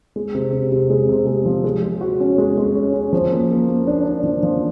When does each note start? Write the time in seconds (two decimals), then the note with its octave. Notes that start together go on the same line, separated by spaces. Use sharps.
0.16 G#3
0.35 C3
0.53 C3
0.72 C3
0.90 G#3
1.09 C3
1.27 G#3
1.46 F3
1.64 G#3
1.83 G#3
2.01 F#4
2.20 C#4
2.38 G#3
2.57 G#3
2.75 C#4
2.93 C#4
3.13 F3
3.32 A#3
3.50 A#3
3.68 A#3
3.87 D4
4.05 D4
4.24 F3
4.43 F3